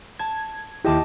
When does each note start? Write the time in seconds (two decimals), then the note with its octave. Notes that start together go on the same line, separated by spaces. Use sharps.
0.19 A5 G#6
0.85 D#2 E4 G4 D#5 A5 D6